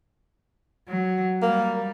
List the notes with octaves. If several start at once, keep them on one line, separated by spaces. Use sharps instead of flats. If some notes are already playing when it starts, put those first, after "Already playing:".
F#3
G3 A#3